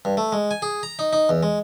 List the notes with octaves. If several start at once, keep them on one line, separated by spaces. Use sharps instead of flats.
G2
A3
G#3
G#5
G#4
A#5
D#4
D#4
E2
G#3